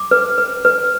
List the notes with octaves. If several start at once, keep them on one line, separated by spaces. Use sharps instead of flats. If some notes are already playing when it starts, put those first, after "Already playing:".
Already playing: D6
B4
B4
B4